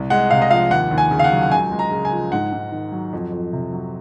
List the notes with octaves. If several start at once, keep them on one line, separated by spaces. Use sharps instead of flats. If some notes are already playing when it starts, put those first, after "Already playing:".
Already playing: C2
G#3 F#5
C3 F5
D#5
F3 F5
D#2 F#5
D#2
G#5
C#3
F5
F#5
F#3
F#5
C#2 G#5
G#3
A#5
C#3
G#5
F3
G#2 F#5
G#2
D#3
F#3
F2
F2
C3
F#3